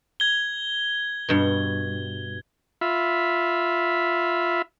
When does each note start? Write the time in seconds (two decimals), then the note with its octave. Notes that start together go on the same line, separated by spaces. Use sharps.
0.20 G#6 G7
1.29 G2 B2
2.81 F4 E5 B5